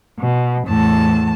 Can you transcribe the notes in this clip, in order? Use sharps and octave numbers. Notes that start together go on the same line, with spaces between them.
B2
E2 A2 A5